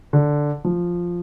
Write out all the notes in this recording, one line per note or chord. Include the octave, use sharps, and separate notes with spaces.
D3
F3